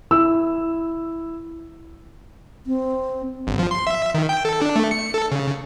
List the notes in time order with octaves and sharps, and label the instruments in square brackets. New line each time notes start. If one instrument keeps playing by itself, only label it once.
[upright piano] E4 E6
[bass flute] C4
[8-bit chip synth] G1
F3
C6
E5
D#3
G5
A4
D4
A3
C#7
A4
C#3